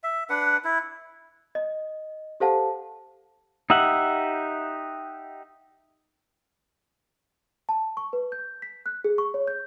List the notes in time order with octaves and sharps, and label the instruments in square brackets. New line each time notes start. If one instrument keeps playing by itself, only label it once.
[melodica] E5
D4 B4 F#5
E4
[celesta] D#5
G4 A4 C5 F5 F#5 A5
[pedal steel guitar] D#4 G4 E5 F#5
[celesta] A5
C#6
B4
G6
B6
F#6
G#4
C#6
C#5
G6